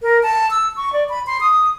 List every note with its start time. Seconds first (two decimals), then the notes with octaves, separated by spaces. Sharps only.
0.02 A#4
0.23 A5
0.51 E6
0.76 C#6
0.93 D5
1.09 B5
1.27 C6
1.41 D#6